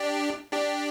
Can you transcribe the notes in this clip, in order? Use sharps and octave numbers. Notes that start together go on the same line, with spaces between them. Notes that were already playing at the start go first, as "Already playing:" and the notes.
Already playing: D4 G4
D4 G4